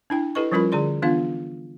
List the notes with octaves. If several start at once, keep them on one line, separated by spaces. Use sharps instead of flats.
D4 E4 G5
E4 G4 A4 B4 D#5 C#6
F3 G3 C#4 F4 A#4 B5
D3 G#4 D5 C6
E3 B3 D4 F4 F5